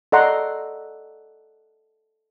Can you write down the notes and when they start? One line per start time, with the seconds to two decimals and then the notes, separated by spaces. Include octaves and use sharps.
0.12 A4 D5 D#5 F#5 A#5 C6